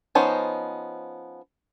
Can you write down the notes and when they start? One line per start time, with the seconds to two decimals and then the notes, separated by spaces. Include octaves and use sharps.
0.15 F3 B3 C#4 D#4 C5